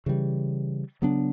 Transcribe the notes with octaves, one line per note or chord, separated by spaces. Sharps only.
C#3 E3 G3
C#3 F#3 B3 D4